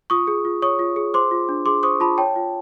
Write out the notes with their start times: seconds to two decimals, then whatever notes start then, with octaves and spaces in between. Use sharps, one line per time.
0.10 F4 C#6 D#6
0.27 G#4
0.45 F4
0.62 C#5 C#6 D#6
0.79 F4
0.96 G#4
1.14 C5 C6 D6
1.31 F4
1.49 D4
1.66 G#4 C6 D6
1.83 C5 C#6 D#6
2.00 F4 A5 B5
2.18 C#5 G5 A5
2.36 F4